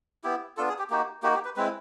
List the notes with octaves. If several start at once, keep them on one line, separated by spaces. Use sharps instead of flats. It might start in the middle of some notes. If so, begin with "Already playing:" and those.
B3 E4 G4
B3 D4 F4 A4
G#4
G4
A#3 D#4 F#4 G4
A#3 D#4 F#4 G4
G4
B4
G#3 C4 E4 B4